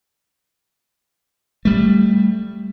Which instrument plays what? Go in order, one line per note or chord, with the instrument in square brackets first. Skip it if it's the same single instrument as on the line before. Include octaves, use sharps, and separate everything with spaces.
[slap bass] G3 A3